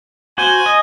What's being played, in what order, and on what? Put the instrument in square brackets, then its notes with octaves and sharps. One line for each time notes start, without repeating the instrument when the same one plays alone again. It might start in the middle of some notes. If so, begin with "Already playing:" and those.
[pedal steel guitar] F#4 C5 [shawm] G#5
[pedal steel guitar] D#5